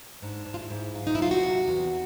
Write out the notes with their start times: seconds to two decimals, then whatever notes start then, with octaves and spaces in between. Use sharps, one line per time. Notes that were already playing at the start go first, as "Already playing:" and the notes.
0.22 G#2 D4
0.46 G#2
0.54 F4
0.59 E4
0.70 G#2
0.94 F#3 F4
1.07 D#4
1.15 E4
1.19 F#3 F4
1.31 F#4
1.43 C3
1.68 E2